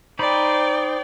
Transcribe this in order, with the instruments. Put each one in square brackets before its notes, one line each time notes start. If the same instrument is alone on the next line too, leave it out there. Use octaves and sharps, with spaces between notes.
[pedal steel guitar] D#4 C5 B5 [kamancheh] D5 G5